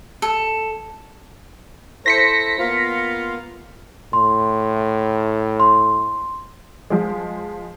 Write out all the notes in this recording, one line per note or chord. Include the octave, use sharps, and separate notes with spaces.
A4
E4 A4 C5 A#6 B6 C#7
A#3 B3 F4
A2 C6
C6
F3 G#3